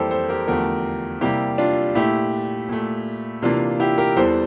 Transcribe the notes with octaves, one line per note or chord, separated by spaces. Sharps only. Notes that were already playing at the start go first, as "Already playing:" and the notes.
Already playing: F2 E3 G3 A#3 E4 G4 A4 C5
A4 C5
G4 A#4
E2 D3 F3 A3 G4 A#4
C3 G3 A#3 E4 G4
D4 F4
A#2 A3 E4 G4
A#2 A3
C3 E3 A#3 D4 F4
E4 G4
G4 A#4
E2 E3 G3 A4 C5